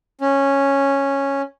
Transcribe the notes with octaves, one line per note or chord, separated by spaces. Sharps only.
C#4